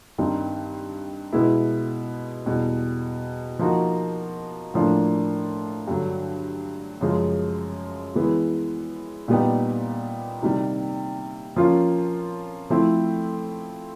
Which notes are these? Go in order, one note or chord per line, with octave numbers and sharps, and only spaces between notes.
G2 D#3 G3 C4 D#4
B2 G#3 B3 E4
E2 B2 G3
F3 A#3 D#4 F#4
A2 F3 A#3 D4
G2 D3 F#3
F#2 C#3 F3 G#3
E3 G#3 B3
A#2 G3 B3 D#4 G4
C3 D#3 G3
F3 A#3 C#4 F4
F3 A3 C4 E4